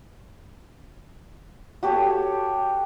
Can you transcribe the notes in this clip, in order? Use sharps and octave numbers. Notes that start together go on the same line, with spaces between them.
F#4 G4 A4 C#5